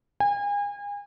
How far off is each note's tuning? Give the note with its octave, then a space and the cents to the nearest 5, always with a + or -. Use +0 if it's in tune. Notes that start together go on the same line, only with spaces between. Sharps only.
G#5 -35